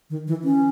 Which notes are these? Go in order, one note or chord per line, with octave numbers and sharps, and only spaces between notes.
D#3
E3
C#4